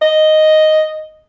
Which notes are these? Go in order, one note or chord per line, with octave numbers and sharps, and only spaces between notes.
D#5